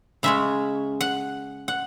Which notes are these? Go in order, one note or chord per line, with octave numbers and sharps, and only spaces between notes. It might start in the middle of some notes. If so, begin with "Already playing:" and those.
C#3 G#3 C#4 E5
F#5
F#5